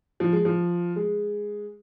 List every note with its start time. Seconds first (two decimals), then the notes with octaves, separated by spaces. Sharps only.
0.20 F3
0.33 G#3
0.45 F3
0.96 G#3